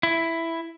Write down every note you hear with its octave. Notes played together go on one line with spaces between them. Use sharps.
E4